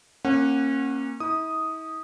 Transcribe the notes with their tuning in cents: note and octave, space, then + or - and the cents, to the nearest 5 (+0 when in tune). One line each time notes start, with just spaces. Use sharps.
A#3 +0 C#4 -30 F#5 +0
E4 -45 D#6 +0